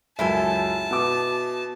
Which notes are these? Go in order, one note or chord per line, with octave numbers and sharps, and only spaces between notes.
C#2 F#2 E4 A4 G#5 A5
B2 D6